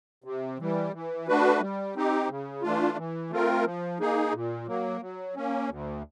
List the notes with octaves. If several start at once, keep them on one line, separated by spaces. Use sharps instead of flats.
C3
E3 G3
E3
A3 D4 F#4 B4
G3
C4 D#4 G4
C#3
E3 A3 D4 F4
E3
A3 C4 F4 A#4
F3
A#3 D#4 G#4
A#2
F#3 A#3
F#3
A#3 C#4
D2